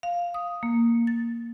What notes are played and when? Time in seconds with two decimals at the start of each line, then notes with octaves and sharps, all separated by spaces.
0.03 F5
0.34 D#6
0.63 A#3
1.07 A6